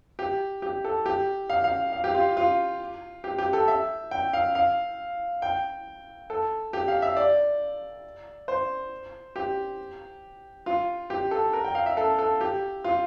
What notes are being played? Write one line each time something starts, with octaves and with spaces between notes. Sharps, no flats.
G4
G4
A4
G4
F5
F5
F5
G4
F4
F4
G4
G4
A4
E5
G5
F5
F5
G5
A4
G4
F5
E5
D5
C5
G4
F4
G4
A4
A#4
G5
F5
E5
A4
A4
G4
F4